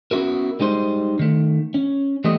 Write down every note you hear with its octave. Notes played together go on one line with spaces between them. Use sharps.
B3 C#4 E4 F#4 A#4
G3 G#3 D#4 C5
D#3 A3
C#4
E3 G3 A3 B3 D#5